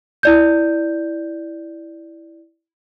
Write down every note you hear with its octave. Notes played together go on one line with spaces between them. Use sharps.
E4 D5 G6